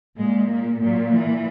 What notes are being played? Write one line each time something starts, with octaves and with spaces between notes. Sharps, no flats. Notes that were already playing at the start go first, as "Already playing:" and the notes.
A#2 G#3
A#3
A#2 F#3
E3